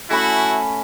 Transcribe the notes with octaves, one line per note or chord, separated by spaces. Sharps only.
A3 C#4 E4 F#4 B5